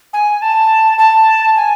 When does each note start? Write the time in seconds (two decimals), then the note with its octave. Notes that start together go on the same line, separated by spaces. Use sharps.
0.13 G#5
0.42 A5
0.99 A5
1.56 G#5